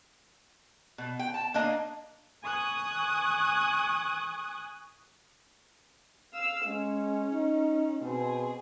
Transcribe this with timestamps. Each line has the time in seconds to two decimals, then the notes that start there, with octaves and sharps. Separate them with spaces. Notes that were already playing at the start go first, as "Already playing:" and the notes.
0.98 B2
1.19 G5
1.34 A5
1.54 A#3 D4 D#5
2.43 G#5 C#6 D#6 F#6
6.32 F5 E6
6.65 G#3 C#4
7.33 D#4
8.02 B2 C4 G#4